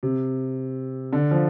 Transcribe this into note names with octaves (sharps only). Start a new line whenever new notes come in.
C3
D3
F3